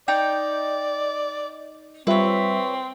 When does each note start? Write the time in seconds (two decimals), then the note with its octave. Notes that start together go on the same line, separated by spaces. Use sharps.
0.08 D#4 D5 G5
2.07 G3 C4 F4 B4 C#5 E5